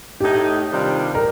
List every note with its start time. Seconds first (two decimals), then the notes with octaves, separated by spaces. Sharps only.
0.20 A2 A3 D#4 G4
0.70 C3 D#3 G3 D4 F4
1.15 A#4